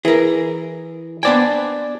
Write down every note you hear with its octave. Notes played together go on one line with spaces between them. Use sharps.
E3 G#4 A#4
B3 D4 C5 D5 G5 G#5